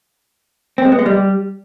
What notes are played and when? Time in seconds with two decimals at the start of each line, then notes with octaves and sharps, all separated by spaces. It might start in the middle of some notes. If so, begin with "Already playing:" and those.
0.78 C4
0.85 G#3
0.92 B3
0.99 G#3
1.06 G3